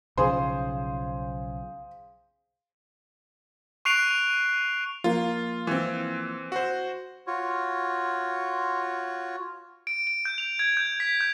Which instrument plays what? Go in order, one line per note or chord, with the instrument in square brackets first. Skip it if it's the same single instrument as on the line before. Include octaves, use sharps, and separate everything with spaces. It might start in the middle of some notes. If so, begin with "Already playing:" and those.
[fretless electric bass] B1 C#3 F3 [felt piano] G#4 C5 C6 [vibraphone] F5
[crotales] C#6 F#6 C7 D7 F7
[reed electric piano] F3 A#3 [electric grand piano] F4
[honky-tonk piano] E3 C4
[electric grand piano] F#4 C5
[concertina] F4 F#4 C#5
[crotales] D7
D7
G6
F7
G#6
G6
B6
G6